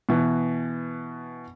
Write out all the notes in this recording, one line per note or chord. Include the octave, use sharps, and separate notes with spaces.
B2 E3